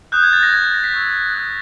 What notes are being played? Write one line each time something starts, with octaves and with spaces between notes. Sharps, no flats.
D#6 F#6 G6
G#6
A6
A#6
D#6 G6 G#6
A6
A#6
B6
C#6 E6 G6
D#6 F#6